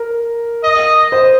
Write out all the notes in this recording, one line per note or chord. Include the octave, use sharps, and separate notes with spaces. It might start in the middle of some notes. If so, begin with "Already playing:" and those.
Already playing: A#4
D#5
C5